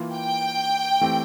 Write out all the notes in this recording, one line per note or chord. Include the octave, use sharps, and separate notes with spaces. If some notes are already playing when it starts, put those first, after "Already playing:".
Already playing: E3 A#3 F4
G5
E3 A3 C4 G4